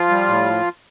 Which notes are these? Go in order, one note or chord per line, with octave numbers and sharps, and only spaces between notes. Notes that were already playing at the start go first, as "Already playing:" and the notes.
Already playing: F3 F4
G3
A2